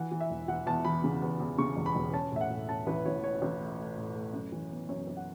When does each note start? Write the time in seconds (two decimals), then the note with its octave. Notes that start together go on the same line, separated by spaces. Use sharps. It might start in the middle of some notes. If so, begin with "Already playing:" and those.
Already playing: E3 F#5
0.12 E3
0.20 E5
0.30 E1
0.48 E3 F#5
0.67 E2 A5
0.85 E3 B5
1.04 C#3
1.22 E2
1.40 E2
1.58 C#3 C#6
1.77 E1
1.86 B5
1.95 E1
2.14 C#4 A5
2.32 A2 E5
2.41 F#5
2.51 A2
2.69 C#4 A5
2.87 A1 B4
3.06 A1 C#5
3.24 C#4 C#5
3.42 A1
3.60 A3
3.79 A3
3.97 A2
4.16 A3
4.33 F#2
4.52 E3
4.71 B3
4.89 F#2 C#5
5.07 F#2
5.17 F#5